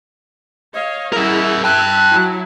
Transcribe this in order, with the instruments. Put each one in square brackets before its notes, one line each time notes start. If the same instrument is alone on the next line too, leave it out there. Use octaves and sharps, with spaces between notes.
[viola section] C#5 F5 [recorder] D#5
[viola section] E4 G#4 F#5 [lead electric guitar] A#4 E5
[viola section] E5 [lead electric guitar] G5 A5 [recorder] F#6
[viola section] F#3 E4